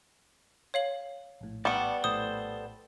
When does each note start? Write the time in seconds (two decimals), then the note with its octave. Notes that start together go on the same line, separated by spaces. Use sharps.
0.74 C#5 F5 F#7
1.41 A#1 A2
1.65 G3 B3 D5 A5 C#6
2.04 A#1 A2 A4 C5 D#6